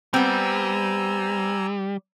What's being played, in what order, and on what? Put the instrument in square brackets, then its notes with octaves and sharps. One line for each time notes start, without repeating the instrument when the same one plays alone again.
[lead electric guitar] G3 [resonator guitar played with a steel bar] B3 C4 [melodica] G#5 A#5 E6